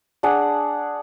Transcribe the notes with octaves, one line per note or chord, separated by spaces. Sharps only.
D4 G#4 F#5